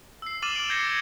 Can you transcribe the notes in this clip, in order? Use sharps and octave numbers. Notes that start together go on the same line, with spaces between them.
E6 C7
D6 F6 A6 D#7 E7 F#7
F6 D7
G6 G#6 A#6 C7 C#7 G7
G#6